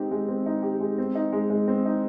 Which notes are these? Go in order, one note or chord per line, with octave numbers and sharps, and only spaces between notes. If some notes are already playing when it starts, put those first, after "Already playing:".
Already playing: G#3 C4 D#4 G4
G#3
C4
D#4
G4
G#3
C4
D#4
G#3
G#3
C4
D#4